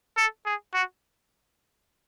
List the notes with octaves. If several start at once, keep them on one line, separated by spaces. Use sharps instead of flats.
A4
G#4
F#4